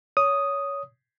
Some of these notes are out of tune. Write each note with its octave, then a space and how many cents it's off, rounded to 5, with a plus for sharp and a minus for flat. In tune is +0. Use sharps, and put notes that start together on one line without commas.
C#5 +20 D#6 +0